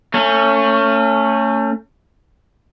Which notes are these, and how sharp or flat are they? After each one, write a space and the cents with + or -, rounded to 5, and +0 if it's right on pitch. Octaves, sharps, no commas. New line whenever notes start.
A3 +30 C#4 +0